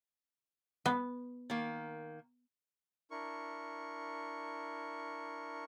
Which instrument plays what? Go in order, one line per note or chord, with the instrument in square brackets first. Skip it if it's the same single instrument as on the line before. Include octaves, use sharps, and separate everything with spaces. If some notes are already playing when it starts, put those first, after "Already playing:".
[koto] B3
[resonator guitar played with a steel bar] D#3 A#3
[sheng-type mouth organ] D4 E4 A#4 C#6